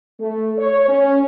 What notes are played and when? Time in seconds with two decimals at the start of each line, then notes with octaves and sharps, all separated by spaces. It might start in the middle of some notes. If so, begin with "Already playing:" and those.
0.19 A3
0.57 C#5
0.88 C#4